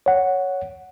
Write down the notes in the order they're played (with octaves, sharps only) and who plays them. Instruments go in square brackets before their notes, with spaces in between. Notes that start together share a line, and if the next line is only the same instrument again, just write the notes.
[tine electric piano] C#5 F#5